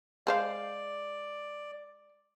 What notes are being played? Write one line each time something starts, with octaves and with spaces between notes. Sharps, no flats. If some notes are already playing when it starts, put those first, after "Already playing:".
G#3 C5 D5 F5